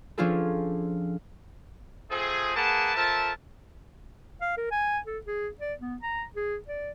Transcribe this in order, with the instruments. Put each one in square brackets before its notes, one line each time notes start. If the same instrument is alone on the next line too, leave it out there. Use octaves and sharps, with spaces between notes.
[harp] F3 C#4 D4 F4 G#4 A4
[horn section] F3 A3 C4 G#4
A#3 G#4 B4 F#5 A5
F3 A4 A#4 E5 A5
[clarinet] F5
A#4
G#5
A4
G#4
D5
B3
A#5
G#4
D5